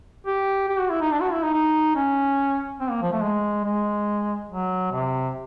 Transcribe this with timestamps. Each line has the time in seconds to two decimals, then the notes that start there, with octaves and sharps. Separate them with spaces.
0.26 G4
0.69 G4
0.79 F#4
0.90 E4
1.01 D#4
1.11 D4
1.22 F#4
1.32 E4
1.44 D#4
1.54 D#4
1.96 C#4
2.81 C4
2.91 A#3
3.02 F3
3.12 A3
3.23 G#3
3.64 G#3
4.50 F#3
4.92 C3